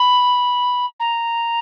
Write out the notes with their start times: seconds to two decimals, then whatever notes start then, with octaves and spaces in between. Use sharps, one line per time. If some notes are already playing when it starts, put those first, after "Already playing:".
Already playing: B5
0.99 A#5